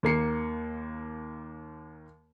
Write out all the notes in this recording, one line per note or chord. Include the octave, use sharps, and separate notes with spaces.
D#2 A#3 C7 C#7